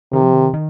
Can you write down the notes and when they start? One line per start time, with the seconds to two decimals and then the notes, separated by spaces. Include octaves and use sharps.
0.13 C3 D#3
0.23 F3
0.33 D#3
0.54 D#3